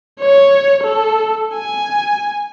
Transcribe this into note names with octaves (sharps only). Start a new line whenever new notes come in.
C#5
A4
G#5